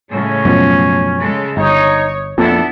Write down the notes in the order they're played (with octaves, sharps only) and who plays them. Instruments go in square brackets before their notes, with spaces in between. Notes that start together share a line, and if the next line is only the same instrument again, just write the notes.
[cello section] A2 C#3 G#3 [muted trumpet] C#4
[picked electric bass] F#2 B2 F3
[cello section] C#3 G#3 A4
[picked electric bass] G1 [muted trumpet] D#4 [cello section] C#5
[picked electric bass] A#1 F2 A#2 [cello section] B3 D4 E4 [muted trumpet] A4